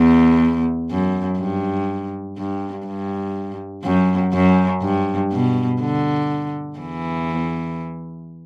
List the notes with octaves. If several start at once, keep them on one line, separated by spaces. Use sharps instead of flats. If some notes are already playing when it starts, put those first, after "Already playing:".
Already playing: E2
F#2
G2
G2
G2
F#2
F#2
G2
B2
D3
E2 E3